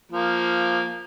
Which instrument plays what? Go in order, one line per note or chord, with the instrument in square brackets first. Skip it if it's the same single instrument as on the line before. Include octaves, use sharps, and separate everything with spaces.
[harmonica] F3 A#3